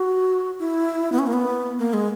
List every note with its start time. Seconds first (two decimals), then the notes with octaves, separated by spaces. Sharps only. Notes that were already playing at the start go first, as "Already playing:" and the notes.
Already playing: F#4
0.59 E4
1.12 B3
1.19 C#4
1.27 A#3
1.33 B3
1.79 A#3
1.93 G#3